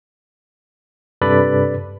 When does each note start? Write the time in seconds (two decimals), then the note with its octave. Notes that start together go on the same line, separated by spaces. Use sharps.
1.21 G2 C3 A4 B4 D5 B5